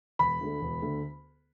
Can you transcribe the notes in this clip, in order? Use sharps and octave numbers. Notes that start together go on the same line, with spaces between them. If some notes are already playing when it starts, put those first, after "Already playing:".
E1 B5
D2 D3 A3
E1
D2 D3 A3